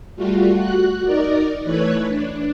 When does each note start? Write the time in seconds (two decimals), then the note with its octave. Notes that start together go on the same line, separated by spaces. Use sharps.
0.16 G3 A3 F4 F#4
0.54 F#4 F#6
1.04 D#4 A#4 D5
1.64 E3 A3 B4 C#5 F#6 G#6
2.08 D4